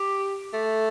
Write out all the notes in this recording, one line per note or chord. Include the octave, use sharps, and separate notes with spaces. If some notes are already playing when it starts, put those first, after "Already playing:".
Already playing: G4
A3